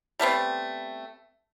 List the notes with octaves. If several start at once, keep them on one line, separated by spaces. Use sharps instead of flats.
G3 A3 B3 C4